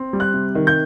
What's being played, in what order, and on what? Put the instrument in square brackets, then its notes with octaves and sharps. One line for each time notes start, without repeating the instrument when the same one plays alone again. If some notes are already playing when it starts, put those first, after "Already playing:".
Already playing: [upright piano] C4
G3
F#6
C3
D#3
G6